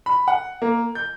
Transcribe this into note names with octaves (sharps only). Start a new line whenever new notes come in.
B5
F#5
A#3
G6